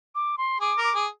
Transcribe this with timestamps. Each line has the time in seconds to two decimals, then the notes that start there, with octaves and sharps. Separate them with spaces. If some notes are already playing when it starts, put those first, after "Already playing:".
0.15 D6
0.38 C6
0.60 G#4 D6
0.78 A#4
0.84 D6
0.95 G#4